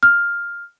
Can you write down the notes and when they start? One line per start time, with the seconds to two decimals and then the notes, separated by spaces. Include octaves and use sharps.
0.03 F6